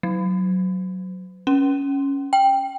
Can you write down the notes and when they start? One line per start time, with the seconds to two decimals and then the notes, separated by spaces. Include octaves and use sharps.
0.03 F#3
1.47 C#4
2.33 G5